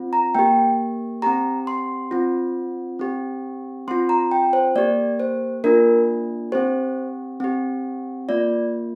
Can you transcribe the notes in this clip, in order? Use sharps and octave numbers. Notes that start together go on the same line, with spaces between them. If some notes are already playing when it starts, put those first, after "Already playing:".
Already playing: C4 F4
A#5
A#3 G4 G5
C4 G4 A#5
C6
C4 F4
C4 G4
C4 F4 C6
A#5
G5
C5
A#3 G4 D5
C5
A#3 D4 F4 A#4
C4 G4 C5
C4 G4
A#3 F4 D5